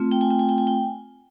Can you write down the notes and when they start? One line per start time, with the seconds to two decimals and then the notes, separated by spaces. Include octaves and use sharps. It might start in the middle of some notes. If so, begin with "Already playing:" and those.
Already playing: A3 C4 F4
0.12 G5
0.21 G#5
0.30 G5
0.39 G#5
0.49 G5
0.58 G#5
0.67 G5